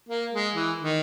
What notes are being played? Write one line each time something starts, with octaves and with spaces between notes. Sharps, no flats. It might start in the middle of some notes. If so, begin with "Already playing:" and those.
A#3
G#3
E3
D#3